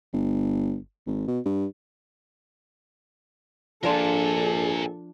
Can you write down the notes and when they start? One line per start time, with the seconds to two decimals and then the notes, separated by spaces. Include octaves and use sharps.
0.13 G1
1.07 G#1
1.28 B2
1.45 G2
3.83 A#1 F3 D4 F4 A4 A#4 G#5